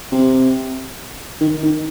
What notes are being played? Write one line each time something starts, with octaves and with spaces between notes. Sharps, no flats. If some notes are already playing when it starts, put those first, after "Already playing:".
C3
D#3
D#3